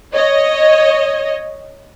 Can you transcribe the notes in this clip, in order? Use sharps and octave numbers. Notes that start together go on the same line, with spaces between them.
C#5 D#5